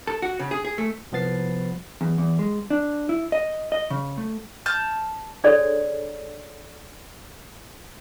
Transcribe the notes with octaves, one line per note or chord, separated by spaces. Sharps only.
A4
F#4
C#3
G#4
G#4
A3
C2 F3 B3 A6 C7
E2
E2
G#3
D4
E4
D#5
D#5
C#3
A3
A5 F6 G6
D4 F#4 G#4 A4 C#5 D5